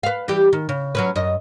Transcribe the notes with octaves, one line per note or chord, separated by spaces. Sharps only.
B4 F5
E3 G3 G4
D#3
C#3
F#3 C#4 B4
F#2 D#5